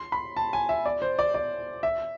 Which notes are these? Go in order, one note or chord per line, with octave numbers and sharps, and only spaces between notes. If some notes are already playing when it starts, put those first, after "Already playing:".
Already playing: C6
B5
A5
G#5
E5
D5
C5
D5
D5
E5